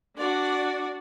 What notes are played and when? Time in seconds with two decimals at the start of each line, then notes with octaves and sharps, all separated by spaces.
0.17 D4 F#4 D5